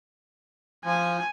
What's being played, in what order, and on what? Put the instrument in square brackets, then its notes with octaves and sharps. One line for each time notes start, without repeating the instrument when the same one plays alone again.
[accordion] F3 [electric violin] G#5